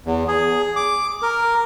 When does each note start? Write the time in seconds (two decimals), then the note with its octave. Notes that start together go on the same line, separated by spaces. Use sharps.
0.06 E2
0.28 G#4
0.76 D6
1.22 A#4